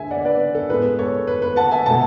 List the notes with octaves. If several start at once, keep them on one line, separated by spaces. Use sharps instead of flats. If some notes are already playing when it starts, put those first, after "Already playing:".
Already playing: D2 D3 G#3 E5 G#5
D5 F#5
B4 D5
A4
A2 G#3 B3 B4
A4 C#5
B4
B4
F#5 A5
E5 G#5
B2 A3 F#5 A5